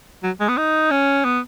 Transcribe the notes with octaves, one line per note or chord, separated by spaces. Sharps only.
F#3
G#3
B3
D#4
C#4
B3